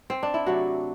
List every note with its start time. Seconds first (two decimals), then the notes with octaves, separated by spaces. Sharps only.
0.10 C4
0.23 D4
0.34 E4
0.46 C3 F#3 A3 F#4